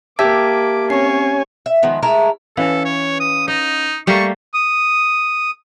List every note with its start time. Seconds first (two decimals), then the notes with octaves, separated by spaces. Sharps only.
0.19 A#3 G4 E5 A5 D6 G#6 B6
0.90 C4 C#4 C#5 G#5 C7
1.66 E5
1.83 D#3 F3 G#3 B3
2.02 G#3 A3 E4 A#4
2.57 E3 C#4 A4 B4 F5
2.85 C#5
3.20 D#6
3.48 D#4 D#5
4.07 G3 A3 A#3 C#6
4.54 D#6